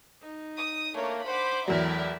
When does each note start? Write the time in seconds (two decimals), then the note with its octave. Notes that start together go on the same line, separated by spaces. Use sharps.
0.22 D#4
0.57 D#6
0.95 A3 A#3 D4 A#4 C#5
1.25 D4 C5 F#5 B5 D6
1.68 E2 A2 F#3 A#4 D5 E5